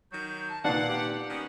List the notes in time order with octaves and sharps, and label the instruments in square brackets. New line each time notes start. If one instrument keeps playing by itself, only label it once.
[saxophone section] D#3 F#3 [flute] G6
[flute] A5
[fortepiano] A#2 D#3 [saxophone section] D4 F#5 [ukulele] B4 D5 A5 [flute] F5
[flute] G4
[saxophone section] D#3 B3 C#4